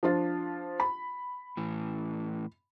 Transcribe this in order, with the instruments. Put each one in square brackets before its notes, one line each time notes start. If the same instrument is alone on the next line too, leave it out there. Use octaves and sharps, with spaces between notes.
[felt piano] F3 D4 F4
B5
[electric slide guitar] A2 E3